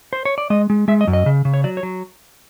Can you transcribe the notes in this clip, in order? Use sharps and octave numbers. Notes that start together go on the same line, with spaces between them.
C5
C#5
D5
G#3 D#5
G#3
G#3 E5
D#5
F#2
D#5
C#3
C#3
C#5
F#3 D5
C#5
F#3